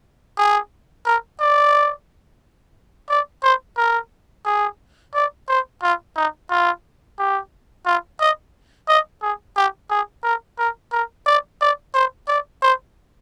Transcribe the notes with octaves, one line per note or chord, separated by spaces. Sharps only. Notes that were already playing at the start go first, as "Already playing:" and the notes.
G#4
A#4
D5
D5
C5
A#4
G#4
D5
C5
F4
D#4
F4
G4
F4
D#5
D#5
G#4
G4
G#4
A#4
A#4
A#4
D5
D5
C5
D5
C5